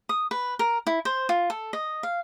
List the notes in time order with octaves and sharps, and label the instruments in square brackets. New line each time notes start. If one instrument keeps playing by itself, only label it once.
[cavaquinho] D#6
B4
A#4
E4
C5
F4
A4
D#5
F5